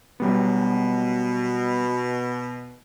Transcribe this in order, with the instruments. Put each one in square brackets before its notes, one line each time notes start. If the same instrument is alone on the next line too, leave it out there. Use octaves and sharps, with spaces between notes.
[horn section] B2 [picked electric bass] F#3 G3 B3